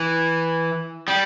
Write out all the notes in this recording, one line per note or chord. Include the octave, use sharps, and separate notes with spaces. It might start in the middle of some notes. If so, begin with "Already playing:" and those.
Already playing: E3
G3